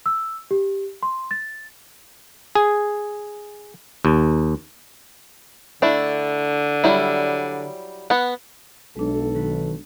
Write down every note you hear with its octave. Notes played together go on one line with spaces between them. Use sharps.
E6
G4
C6
A6
G#4
D#2
D3 A3 D4 E4
F#3 G3 E4
B3 F#5
B1 G#3 D4 A4
D#3 B4